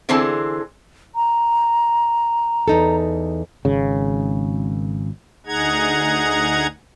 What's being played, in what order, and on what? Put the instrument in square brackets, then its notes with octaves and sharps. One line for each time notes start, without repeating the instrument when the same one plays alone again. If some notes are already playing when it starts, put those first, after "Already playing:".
[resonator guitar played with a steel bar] D3 E3 C4 G#4 C5 A5
[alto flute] A#5
[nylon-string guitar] E2 D#4 A4
[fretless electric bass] G#1 C#3
[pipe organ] D2 D#4 G#4 F#5 A#5 G#6